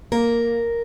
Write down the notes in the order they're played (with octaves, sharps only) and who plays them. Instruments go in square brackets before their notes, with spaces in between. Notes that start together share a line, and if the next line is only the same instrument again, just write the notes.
[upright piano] A#3 [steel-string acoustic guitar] A#4